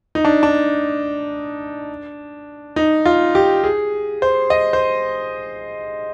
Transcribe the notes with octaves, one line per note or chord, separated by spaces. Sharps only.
D#4
D4
D4
D#4
F4
G4
G#4
C5
D#5
C5